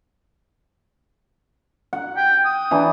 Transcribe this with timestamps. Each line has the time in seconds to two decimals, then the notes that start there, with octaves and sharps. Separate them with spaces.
1.93 F#5
2.16 G5
2.45 D#6
2.71 E3 D4 B4